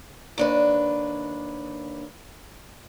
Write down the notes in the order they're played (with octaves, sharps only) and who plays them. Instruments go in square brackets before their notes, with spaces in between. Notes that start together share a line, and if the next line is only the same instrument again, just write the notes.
[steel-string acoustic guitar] D#2 D4 B4